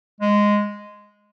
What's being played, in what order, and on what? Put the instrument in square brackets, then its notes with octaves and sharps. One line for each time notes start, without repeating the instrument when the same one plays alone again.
[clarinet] G#3